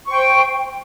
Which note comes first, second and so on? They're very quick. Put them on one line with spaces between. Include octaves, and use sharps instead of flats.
C#6 C5 G5